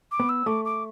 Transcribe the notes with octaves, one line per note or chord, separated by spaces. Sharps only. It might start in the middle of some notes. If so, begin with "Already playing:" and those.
D6
B3
E6
A3 D6
D6